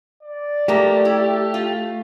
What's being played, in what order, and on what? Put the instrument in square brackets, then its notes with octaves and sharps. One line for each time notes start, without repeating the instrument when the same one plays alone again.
[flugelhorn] D5
[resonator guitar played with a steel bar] F3 A#3 A#4 [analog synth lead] A3 [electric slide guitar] G4
[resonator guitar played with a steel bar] E4
F4